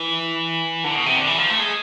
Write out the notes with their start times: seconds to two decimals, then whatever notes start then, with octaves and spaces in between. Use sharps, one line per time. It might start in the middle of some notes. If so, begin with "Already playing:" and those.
Already playing: E3
0.84 D3
0.95 B2
1.06 C3
1.17 D3
1.27 E3
1.38 F3
1.50 A3
1.60 G#3